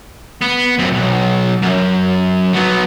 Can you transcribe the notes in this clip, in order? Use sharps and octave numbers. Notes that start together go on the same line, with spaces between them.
B3
F#2 C4
B1
F#2
F#3 B3